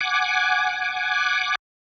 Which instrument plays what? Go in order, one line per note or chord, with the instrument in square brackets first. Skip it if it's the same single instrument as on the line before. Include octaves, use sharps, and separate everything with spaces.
[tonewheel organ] F#5 G#5 D6